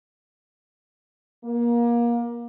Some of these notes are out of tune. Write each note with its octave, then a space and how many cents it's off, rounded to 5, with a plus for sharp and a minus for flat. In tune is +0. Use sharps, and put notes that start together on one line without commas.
A#3 +25